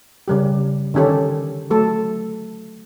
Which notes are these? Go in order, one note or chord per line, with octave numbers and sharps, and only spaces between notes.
C#3 G3 G4
D3 D#3 C#4 G4 A4
F#3 A3 A4